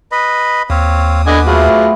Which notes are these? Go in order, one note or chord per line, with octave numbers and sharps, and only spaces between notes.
B4 D#5 B5
D#2 C4 C#5 F5
D3 B3 B4 D#5 G#5 D6
F#3 A3 F4 G#4